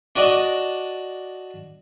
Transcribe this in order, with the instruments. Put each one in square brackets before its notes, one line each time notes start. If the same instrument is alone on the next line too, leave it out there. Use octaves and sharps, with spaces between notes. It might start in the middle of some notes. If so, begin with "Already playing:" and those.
[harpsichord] D4 F#4 D5 D#5 A5